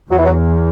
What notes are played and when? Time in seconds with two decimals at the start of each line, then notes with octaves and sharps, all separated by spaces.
0.10 E2 F#3
0.18 E3
0.25 F#3